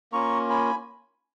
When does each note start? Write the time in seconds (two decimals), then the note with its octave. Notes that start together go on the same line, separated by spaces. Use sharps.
0.12 A#3 C#4 F4 A#5 C#6
0.50 G#5 B5